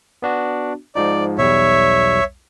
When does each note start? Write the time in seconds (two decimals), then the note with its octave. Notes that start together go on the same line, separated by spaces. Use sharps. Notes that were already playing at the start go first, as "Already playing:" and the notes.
0.22 B3 D4 F#4
0.95 G#2 F3 D#4 D5
1.38 B1 E2 G3 C#5 E5